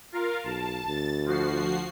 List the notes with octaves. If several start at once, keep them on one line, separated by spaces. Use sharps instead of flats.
F4 A#4 F5
B1 A5
D2 A6
F3 F#4 C7